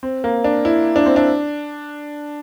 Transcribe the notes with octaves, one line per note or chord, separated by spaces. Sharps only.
C4
A#3
D4
E4
D4
C4
D4